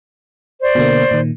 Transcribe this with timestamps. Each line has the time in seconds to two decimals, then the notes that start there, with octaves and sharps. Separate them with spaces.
0.61 C5 D5
0.75 B2 D3 A#3
1.11 A#2 D#3